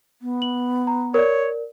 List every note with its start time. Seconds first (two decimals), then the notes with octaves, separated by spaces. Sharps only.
0.22 B3
0.42 F#7
0.87 A#5
1.14 A#4 C#5 D5